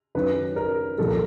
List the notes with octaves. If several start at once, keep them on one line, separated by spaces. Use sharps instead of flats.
F#2 D#3 F#3 B4
A#4
C2 A#2 F3 A4
A#4